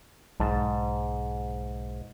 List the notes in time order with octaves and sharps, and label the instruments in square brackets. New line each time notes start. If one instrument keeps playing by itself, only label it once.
[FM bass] B1 [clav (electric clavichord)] G#2 A5